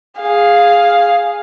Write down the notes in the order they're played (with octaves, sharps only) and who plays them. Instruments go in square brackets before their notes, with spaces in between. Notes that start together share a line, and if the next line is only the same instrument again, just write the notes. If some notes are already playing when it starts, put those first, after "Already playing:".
[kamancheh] G#4 F5